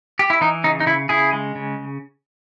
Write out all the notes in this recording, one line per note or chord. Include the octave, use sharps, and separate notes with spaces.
G4
E4
E3 D#4
C#3 D#4
D#4
C#3 E4
C#3 E4 G#4
G#3
C#3